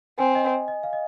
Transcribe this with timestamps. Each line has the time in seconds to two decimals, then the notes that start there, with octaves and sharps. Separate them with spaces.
0.18 C4 G#5
0.35 D#5
0.68 D#5
0.83 F5
0.93 D#5